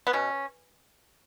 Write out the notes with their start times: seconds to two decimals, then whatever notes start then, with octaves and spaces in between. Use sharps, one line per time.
0.07 B3
0.13 B2 C#4